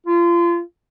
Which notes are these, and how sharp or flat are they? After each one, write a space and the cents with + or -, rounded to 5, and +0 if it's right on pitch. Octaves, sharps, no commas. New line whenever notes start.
F4 -30